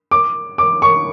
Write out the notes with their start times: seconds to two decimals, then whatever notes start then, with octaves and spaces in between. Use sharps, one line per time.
0.11 D6
0.58 D6
0.82 C#6